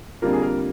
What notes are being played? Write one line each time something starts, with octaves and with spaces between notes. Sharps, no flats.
F2 D3 G3 A#3 F4 A#4
G#4
A#4